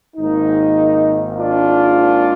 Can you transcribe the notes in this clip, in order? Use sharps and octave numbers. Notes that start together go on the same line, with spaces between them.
G#1 G#2 D#3 A#3 D#4
D4 F4